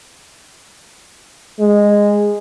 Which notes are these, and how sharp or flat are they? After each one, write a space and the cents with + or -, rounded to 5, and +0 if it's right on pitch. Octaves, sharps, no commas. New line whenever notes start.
G#3 -10